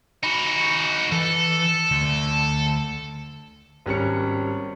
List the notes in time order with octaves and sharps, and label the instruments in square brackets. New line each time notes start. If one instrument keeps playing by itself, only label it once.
[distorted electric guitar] D#4 F#4 [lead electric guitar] G#5 B5
[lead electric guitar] E3 [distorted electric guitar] A4
[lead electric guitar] D2
[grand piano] G#1 G3 C#4 C#7